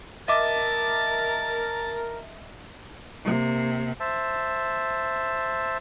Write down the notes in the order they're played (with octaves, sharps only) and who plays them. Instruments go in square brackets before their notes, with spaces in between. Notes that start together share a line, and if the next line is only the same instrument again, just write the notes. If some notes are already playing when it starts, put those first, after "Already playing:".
[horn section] A#4 [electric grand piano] D#5 E5 D6 [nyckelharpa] A5
[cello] C3 A#3
[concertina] C5 E5 A5